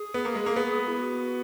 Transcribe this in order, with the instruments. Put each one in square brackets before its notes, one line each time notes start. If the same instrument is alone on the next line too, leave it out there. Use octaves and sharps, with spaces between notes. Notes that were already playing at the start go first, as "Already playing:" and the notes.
Already playing: [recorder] G#4
[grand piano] B3
A#3
G#3
A#3
B3
[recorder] E4
F#4